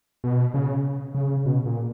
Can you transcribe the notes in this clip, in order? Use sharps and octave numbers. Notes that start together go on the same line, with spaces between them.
B2
C#3
C#3
B2
A#2